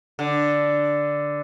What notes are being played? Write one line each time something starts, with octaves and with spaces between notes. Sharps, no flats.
D3